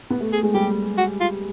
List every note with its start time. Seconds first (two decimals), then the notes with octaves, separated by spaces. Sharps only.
0.10 B3
0.21 A3
0.33 G#4
0.43 G#3
0.54 G3 G4
0.98 F#4
1.20 F4